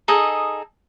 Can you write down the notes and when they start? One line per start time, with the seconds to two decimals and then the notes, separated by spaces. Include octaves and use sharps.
0.08 D#4 G#4 A4 D#5